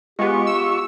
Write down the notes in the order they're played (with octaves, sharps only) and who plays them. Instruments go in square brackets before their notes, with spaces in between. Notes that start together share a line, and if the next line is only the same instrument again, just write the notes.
[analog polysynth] G#3 B3 [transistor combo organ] F4 C#6 [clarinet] G4
[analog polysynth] E6